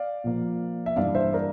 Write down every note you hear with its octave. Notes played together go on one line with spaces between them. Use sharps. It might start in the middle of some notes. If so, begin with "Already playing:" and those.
Already playing: D5 F5
A#2 F3 A#3
E5
G2 E3 A#3 D5 F5
C5 E5
A#4 D5